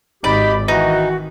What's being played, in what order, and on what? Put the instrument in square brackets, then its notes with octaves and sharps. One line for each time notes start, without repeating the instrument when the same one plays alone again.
[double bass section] G#1 [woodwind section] D#4 G4 B5 [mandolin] D5
[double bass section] D#3 [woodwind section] E3 F#4 [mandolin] D#4